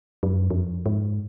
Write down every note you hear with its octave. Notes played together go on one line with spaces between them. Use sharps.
F#2
F2
G#2